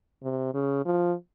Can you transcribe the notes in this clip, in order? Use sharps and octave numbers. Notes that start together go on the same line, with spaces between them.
C3
C#3
F3